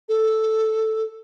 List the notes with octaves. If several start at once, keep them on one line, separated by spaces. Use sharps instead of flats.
A4